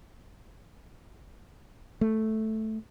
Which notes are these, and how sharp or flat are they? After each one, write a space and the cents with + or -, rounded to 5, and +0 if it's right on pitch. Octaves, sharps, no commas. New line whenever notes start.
A3 -5